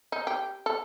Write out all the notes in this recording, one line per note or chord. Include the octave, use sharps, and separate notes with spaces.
D#4
G4
A4